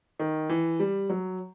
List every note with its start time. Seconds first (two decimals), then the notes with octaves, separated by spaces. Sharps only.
0.19 D#3
0.49 E3
0.80 G3
1.10 F#3